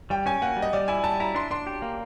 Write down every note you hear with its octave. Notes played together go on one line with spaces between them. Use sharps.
G3 G5
C#4 G#5
A#3 F#5
G3
D#5
G3 D5
E4 G#5
G3 A5
E4 A#5
D4 C6
D4 C6
G4
A#3